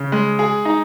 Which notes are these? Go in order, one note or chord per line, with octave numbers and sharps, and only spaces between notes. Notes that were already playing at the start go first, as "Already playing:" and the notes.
Already playing: C#3
G#3
G#4
D#4